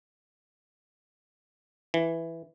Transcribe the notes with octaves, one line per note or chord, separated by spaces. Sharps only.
E3